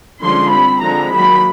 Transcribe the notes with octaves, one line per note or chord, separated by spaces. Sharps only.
D3 F3 G#3 C#4 C6
G3 C4 B5
D3 F3 G#3 C4 A#5
D#3 F#3 A#3 B5